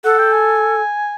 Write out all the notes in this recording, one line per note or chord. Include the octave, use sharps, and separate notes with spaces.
A4 F#5
G5
G#5